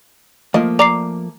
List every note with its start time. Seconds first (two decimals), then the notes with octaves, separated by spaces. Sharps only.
0.54 F3 A3 A#3 F4 D#5
0.79 D5 A#5 D6 C7